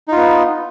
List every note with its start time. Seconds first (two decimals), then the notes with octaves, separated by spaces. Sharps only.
0.08 D#4
0.12 F4
0.17 B3